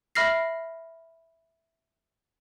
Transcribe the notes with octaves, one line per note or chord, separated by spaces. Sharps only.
E5 B5 F6 A#6 C7